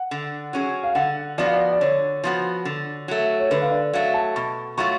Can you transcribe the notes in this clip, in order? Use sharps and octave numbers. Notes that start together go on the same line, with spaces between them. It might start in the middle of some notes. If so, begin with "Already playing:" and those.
Already playing: F#5
D3
F#3 C#4 G#4
F5
D3 F#5
F3 B3 F#4 D5
F5
D5
D5
D3 C#5
F3 B3 F#4
D3
F#3 A3
C#5
D3 B4
F5
D5
F#3 A3 F5
A5
B2 C#6
F#3 A3 F4 C#6